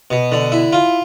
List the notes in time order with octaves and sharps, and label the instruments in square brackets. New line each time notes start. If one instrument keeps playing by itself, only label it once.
[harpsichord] B2
D3
E4
F4